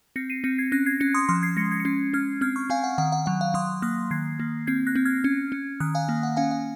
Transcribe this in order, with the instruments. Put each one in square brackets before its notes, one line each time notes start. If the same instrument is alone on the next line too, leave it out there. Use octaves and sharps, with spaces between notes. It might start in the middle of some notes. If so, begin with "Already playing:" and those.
[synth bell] C4 A#6 C#7
C7 D#7
C4 A#6 C#7
G#6 C7
C#4 F#6 A#6
G#6 C7
C#4 A#6 C#7
C6 D#6
F3 C6 D#6
G#6 C7
G#3 A#6 C#7
G#6 C7
C#7
C#4 G#6 C7
C#4 F6 G#6
C4 F6 G#6
C#6 F6
C4 F5 G#5
F#5
D#3 F#5
F#5
F#3 F#5
F5
F#3 C6 D#6
A#3 D#6 F#6
D#3 G#6 C7
A#3
C4 G#6 C7
F#6 A#6
C4
F6 G#6
C#4
C#4
D#3 D#6 F#6
F5 G#5
A#3
F#5
C#4 F5 G#5
F5